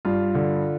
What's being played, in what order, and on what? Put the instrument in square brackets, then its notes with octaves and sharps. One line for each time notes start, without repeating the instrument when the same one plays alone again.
[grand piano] G2 F4
D3